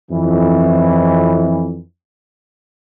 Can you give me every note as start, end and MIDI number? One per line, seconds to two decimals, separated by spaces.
0.11 1.80 41
0.11 1.80 52